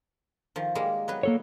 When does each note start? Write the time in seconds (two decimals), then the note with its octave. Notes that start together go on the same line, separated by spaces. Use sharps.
0.56 D#3 F3
0.75 G3 G#3 A#3
1.08 F#3 B3 B4
1.23 A#3 A4 C#5